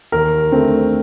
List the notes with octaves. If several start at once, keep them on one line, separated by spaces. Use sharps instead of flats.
D#2 A#4
D3 A3 C4